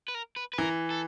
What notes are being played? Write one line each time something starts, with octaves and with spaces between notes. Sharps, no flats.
B4
A#4
B4
B4
E3 A#4
A4